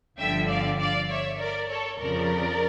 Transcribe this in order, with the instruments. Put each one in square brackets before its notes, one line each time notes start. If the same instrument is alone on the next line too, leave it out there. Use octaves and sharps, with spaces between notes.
[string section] G1 G2 D3 F3 E5 G5
D5 F5
D5 F5
C#5 E5
A#4 D5
A4 C#5
F2 C#3 F3 A#4 D5